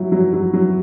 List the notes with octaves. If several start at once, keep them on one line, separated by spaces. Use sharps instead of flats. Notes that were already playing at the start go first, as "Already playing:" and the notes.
Already playing: F#3 E4
F#3
F#3
F#3